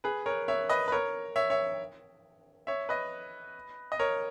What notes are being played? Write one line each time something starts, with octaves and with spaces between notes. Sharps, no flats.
G#4 B4
A#4 C#5
C#5 E5
B4 D#5
B4
A#4 C#5
C#5 E5
C#5 E5
C#5 E5
B4 D#5
D#5
A#4 C#5